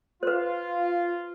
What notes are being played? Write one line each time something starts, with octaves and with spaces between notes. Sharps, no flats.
F4 B4 C5